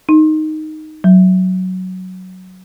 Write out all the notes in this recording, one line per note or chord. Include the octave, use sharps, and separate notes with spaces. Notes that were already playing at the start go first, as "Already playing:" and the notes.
D#4
F#3